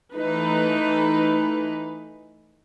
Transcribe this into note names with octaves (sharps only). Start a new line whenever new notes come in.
E3 A3 D#4 B4